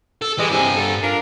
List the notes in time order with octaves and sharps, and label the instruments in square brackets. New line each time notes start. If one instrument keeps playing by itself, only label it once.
[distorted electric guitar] A4
[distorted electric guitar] E3 [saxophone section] G3 G#3
[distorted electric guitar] G2 G#5 [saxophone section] C3
[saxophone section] A4
D4 F4 A#4